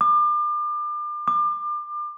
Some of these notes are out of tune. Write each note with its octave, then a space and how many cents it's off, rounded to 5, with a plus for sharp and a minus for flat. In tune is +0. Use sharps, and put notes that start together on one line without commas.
D6 +35
D6 +30